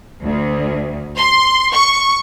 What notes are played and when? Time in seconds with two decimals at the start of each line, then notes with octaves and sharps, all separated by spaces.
0.24 D2
1.16 C6
1.72 C#6